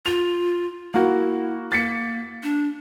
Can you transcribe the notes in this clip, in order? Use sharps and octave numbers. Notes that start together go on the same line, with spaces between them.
F4 F7
A#3 E4 F#4
A#3 A6 B6 C#7
D4